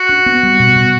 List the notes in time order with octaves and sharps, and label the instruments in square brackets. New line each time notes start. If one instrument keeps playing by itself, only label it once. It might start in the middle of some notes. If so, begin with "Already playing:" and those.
Already playing: [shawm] F#4
[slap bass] D4
B3
G3
B2
B2